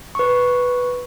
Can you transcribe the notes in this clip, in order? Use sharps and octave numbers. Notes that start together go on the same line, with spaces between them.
B4 C#6